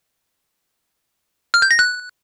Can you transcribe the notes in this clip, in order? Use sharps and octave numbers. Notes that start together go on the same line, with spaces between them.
F6
G6
A#6
F#6